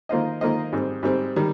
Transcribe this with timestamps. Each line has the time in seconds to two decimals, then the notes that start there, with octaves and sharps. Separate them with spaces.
0.09 D#3 A#3 F4 C5 D#5
0.41 D#3 A#3 F4 C5 D#5
0.72 G#2 G3 C4
1.03 G#2 G3 C4
1.36 D#3 G3